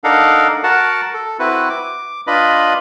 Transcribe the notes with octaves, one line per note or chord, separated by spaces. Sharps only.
D4 D#4 A4 A#4 F5 F#5
F#4 A#4 F#5 A5
A4
C4 E4 F#4 B4
D6
D4 F4 B4 D#5 B5